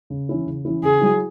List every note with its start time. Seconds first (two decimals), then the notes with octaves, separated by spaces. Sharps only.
0.10 C#3
0.29 E3 C#4 E4
0.47 C#3
0.65 E3 C#4 E4
0.83 C#3 G#4
1.01 F#3 E4